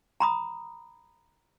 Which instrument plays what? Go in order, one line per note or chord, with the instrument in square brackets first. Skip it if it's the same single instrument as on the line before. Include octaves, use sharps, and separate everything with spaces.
[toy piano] A#5 B5 D#6